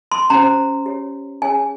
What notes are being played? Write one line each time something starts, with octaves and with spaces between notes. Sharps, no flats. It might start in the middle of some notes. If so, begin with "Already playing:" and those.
C6
C#4 G4 C5 A#5
G4 C#5
C#4 G#4 C#5 G#5